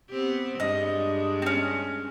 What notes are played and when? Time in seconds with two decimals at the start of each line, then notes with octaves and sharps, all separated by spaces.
0.10 B3 C4 G4
0.60 G2 G#3 D#5
1.42 C4 C#4